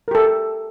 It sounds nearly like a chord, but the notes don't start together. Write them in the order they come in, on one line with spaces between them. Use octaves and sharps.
A#4 G4 A4